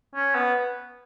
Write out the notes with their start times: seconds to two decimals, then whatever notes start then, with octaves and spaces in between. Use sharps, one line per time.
0.15 C#4
0.35 B3